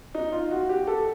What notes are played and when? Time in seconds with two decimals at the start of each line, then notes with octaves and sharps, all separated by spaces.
0.14 D#4
0.32 F4
0.50 F#4
0.69 G4
0.87 A4